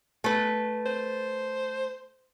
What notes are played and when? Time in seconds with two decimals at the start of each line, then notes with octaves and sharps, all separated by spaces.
0.24 A3 B4
0.86 C5